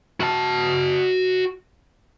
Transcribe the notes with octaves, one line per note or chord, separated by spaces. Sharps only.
F#4 A5